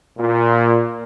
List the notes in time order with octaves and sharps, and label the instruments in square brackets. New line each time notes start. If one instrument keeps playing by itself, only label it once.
[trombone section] A#2